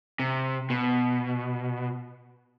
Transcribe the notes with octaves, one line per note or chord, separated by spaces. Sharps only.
C3
B2